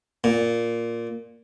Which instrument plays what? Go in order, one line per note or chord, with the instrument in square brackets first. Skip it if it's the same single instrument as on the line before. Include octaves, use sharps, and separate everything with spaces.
[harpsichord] A#2